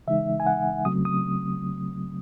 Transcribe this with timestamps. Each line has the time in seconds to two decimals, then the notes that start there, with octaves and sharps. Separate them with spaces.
0.07 C#3 E3 G#3 D#4 E5
0.40 G#5
0.47 F#5
0.85 C#3 F#3 A3 C4 D#6
1.05 D#6